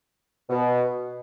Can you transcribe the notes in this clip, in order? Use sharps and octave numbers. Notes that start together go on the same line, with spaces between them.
B2